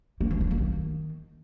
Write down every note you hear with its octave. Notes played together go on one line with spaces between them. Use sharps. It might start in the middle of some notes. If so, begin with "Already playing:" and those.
A#3
F3
A#3
A#3
D#3